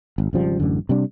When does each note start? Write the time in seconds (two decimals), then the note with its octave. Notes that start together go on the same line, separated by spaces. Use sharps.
0.18 G#1
0.33 G#1 C#3 F3 G3
0.60 A1 F#2 D3
0.89 C3 G3 D4